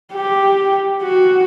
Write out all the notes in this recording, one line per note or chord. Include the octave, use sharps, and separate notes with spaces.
G4
F#4